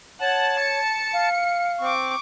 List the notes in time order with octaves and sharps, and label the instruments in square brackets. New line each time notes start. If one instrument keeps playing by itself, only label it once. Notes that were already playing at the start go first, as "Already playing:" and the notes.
[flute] C#5 [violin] F#5 [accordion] A5
[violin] C#7
[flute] F5
[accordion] C4 [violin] C#6 D6